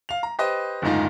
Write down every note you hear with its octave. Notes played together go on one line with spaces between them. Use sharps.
F5 F7
A#5
G4 B4 C5 D#5
F#1 D2 G#2 D#4 F4